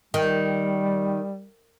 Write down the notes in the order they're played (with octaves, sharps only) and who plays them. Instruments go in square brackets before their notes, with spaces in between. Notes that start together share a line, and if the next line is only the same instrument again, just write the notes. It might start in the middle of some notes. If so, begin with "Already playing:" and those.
[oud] D#3 [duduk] G3